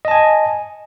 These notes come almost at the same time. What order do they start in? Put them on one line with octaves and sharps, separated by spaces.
D#5 A5 G#5